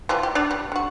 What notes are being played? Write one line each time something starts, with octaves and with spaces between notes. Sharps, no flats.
E3 F3 G3
G4
D4 D5
G3
D3 F#4